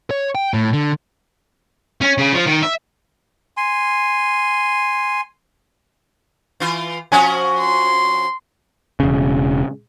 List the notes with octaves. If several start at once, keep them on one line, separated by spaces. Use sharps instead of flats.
C#5
G5
A2
D3
C#4
C#3
F3
D#3
E5
G#5 C6
E3 F4
F3 C#4 F#4 G#5
C6
E1 C#3